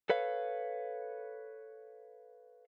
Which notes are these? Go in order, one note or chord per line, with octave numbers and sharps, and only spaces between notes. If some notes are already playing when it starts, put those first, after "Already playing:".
A4 B4 C#5 F5